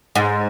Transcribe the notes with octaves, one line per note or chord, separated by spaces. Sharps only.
G#2